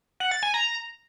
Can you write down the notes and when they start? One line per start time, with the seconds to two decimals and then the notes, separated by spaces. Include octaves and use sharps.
0.20 F#5
0.31 A6
0.43 G#5
0.54 A#5